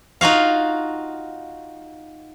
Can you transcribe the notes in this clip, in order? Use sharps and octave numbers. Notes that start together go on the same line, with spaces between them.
D#4 F4 F#4 F5